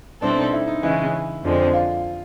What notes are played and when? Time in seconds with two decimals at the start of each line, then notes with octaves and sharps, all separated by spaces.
0.22 B2 G3 C4 D4 E4 A4
0.38 D#4
0.52 E4
0.67 D#4
0.83 C#3 E3 G#3 C#4 E4
1.43 F2 D3 F3 G#3 C4
1.73 F4